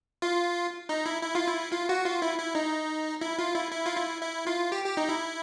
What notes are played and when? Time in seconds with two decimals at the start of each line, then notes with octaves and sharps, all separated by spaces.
0.22 F4
0.89 D#4
1.06 E4
1.22 E4
1.35 F4
1.47 E4
1.72 F4
1.89 F#4
2.05 F4
2.22 E4
2.38 E4
2.55 D#4
3.21 E4
3.39 F4
3.55 E4
3.72 E4
3.86 F4
3.97 E4
4.22 E4
4.47 F4
4.72 G4
4.84 G4
4.97 D#4
5.09 E4